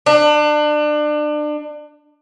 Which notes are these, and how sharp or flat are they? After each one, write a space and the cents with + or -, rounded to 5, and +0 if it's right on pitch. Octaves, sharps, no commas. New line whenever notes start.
D4 +30